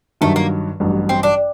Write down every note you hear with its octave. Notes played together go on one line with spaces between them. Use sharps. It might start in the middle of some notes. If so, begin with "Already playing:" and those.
G2 D#3 F#3 A3
A#3
A1 G2 F#3
C4
D4